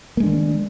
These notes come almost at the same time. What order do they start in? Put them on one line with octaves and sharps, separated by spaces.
A#3 G#3 D4 D#3